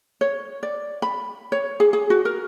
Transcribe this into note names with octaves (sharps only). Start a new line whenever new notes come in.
C#5
D5
B5
C#5
G#4
G#4
F#4
A#4